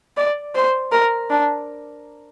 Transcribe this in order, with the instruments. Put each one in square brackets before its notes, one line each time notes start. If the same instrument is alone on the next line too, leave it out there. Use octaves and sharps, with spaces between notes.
[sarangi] D5
C5
A#4
D4